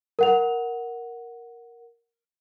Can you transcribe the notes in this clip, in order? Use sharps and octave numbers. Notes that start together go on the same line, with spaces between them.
A#4 F#5 F7